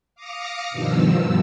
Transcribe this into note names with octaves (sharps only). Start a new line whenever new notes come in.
F5 D6 D#6 F6 A#6 C#7
G2 B2 D#3 F3 E6